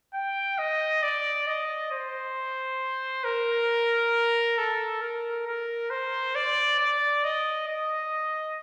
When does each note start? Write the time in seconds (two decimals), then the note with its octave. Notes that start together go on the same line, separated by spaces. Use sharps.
0.14 G5
0.58 D#5
1.03 D5
1.47 D#5
1.92 C5
3.24 A#4
4.58 A4
5.02 A#4
5.47 A#4
5.90 C5
6.35 D5
6.79 D5
7.24 D#5
7.68 D#5